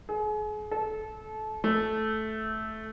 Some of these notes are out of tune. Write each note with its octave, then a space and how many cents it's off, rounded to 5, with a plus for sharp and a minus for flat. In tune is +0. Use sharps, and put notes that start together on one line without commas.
G#4 +35
A4 -25
A3 -10